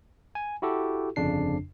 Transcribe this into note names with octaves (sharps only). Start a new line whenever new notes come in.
G#5
E4 F#4 G4 A4
G1 F2 C#3 D4 C7